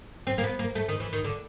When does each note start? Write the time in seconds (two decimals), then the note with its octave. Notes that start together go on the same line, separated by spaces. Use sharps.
0.27 C4
0.38 A#3
0.44 B3
0.59 A#3
0.75 A3
0.88 D#3
1.00 E3
1.13 D#3
1.24 D3